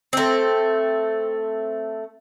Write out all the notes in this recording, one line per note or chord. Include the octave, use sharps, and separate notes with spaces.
A3 C4